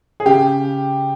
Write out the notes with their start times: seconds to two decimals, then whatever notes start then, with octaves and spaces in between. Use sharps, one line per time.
0.20 G#4
0.26 C#3 G4